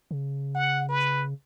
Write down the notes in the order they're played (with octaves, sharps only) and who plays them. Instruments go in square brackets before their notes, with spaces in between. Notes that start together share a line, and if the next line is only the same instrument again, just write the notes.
[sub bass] C#3
[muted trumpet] F#5
B4